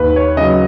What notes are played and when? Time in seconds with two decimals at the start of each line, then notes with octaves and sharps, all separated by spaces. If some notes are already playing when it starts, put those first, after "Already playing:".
Already playing: D#2 B4
0.16 C#5
0.37 C#3 F#3 D#5